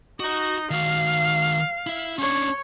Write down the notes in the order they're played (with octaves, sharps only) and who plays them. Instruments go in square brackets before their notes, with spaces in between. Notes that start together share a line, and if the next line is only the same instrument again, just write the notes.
[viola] D#4 [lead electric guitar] F#4
[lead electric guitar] D#3 F#4 [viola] F5
[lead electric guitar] E4 E5
[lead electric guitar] C#4 D4 [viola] C#5